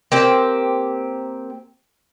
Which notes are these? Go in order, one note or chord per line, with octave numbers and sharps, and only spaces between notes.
A#3 C4 G4